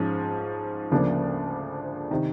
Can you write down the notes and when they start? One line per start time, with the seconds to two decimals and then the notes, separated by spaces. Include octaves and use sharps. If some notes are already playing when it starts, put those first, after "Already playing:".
Already playing: G#2 F3 G#3 C#4
0.91 D2 C#3 F3 A#3 D4
2.11 C3 D#3